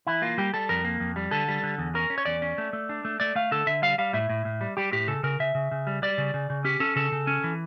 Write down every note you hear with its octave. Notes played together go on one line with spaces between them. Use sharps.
E3 E4
A#3 F4
G3 G4
G3 A4
F2 A#4
A#3
F2
G3
D3 A4
G3
D3
E2
C#4 A#4
C#4
C#5
E2 D5
C#4
A3
A3
D4
A3
A3 D5
A3 F5
D3 A4
D3 E5
G3 F5
G3 F5
A2 E5
A2
A2
G3
G3 G4
A2 G4
C#3 A4
C#3 A#4
C#3 E5
C#3
C#3
G3
G3 D5
C#3
C#3
C#3
C#4 G4
C#4 A4
C#3 A4
C#3
C#4
E3